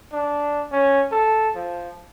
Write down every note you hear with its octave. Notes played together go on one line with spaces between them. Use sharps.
D4
C#4
A4
F3